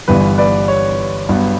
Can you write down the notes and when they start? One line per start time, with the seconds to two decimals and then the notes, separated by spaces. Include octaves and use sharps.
0.08 G1 G2 E3 G3 B3 B4
0.38 B4 D5
0.68 C#5
1.29 G2 F#3 B3